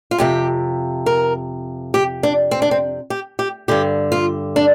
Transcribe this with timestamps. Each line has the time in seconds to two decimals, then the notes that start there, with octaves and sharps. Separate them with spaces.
0.11 F4
0.18 F2 C3 G4
1.06 A#4
1.94 G4
2.23 D4
2.51 C4
2.62 D4
2.71 C4
3.10 G4
3.39 G4
3.68 G2 D3 G4
4.12 F4
4.56 D4